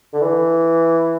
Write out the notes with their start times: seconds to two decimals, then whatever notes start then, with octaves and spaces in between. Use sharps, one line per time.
0.13 D3
0.21 E3